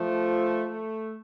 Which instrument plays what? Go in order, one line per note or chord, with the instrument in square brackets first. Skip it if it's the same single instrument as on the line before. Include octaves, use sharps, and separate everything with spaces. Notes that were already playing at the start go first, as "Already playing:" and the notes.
Already playing: [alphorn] F3 [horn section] A3
[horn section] A3